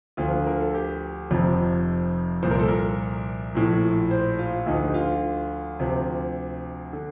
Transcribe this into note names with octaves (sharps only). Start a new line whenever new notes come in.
D2 D3 F3 F4
A#4
A4
G4
F1 F2 C3 F3
C2 A#2 F3 C5
A#4
A4
A#4
A#1 A2 F3
C5
F4
D2 D3 F3 D#4
G4
F4
D2 C3 F3
D3